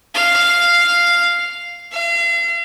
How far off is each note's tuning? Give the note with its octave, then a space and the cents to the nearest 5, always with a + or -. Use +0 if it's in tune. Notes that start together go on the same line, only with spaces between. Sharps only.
F5 -5
F5 -40